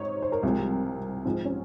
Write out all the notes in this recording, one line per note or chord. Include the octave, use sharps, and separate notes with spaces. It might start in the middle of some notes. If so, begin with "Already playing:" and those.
Already playing: G#2 D#4 C5 C#5
C5
A#4
C2 C3 F3 G#3
G#2 F3 G#3 C4
C#4